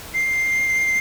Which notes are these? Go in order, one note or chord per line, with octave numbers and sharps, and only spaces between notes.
C7